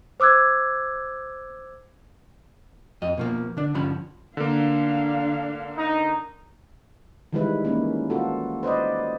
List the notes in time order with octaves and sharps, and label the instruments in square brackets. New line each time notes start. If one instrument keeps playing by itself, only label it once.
[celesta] C5 D6 E6 F#6 G#6
[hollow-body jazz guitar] F2 D#5
B2 F3 A#3
D3 D4
G2 D3 F3 C#4 B5
[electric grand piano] D3 A#3 [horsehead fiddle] D4 F5
[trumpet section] D#4
[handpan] D#3 E3 G3 G#3 E4 B4
A#3 C#4
F4 F#4 A4
B4 C5 D5 D#5